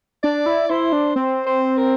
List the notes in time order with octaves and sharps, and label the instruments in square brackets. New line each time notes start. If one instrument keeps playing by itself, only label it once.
[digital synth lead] D4 [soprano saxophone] D5
[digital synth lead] E4
[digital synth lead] E4 [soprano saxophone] C5
[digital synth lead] D4
[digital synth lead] C4 [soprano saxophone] C5
[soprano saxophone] C5
A#4